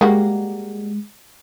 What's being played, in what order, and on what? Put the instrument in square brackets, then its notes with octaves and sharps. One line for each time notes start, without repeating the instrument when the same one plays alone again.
[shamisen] G3 A#3 F#4 [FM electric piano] G#3